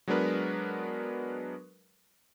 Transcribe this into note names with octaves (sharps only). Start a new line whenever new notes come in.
F#3 G#3 B3 D4 A#4 B4